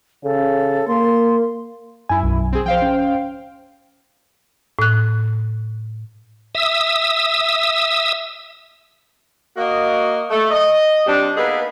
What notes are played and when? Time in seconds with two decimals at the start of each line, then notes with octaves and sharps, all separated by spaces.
0.24 C#3 A4
0.88 A#3 C6
2.10 F#2 E4 G#5
2.24 B1
2.52 C4 G#4
2.66 F3 C5 F5 G5
2.82 C#4
4.79 A2 F#6
6.55 E5 D#6 E6
9.57 A#3 F#4 D#5
10.31 A3
10.51 D#5
11.07 C3 G3 D4
11.37 A#3 B3 D#4 G#4 A4 B4